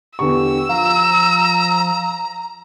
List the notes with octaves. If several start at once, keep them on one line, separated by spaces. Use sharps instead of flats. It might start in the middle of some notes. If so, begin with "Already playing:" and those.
E2 D3 G4 C#6 E6
F3 F5 A#5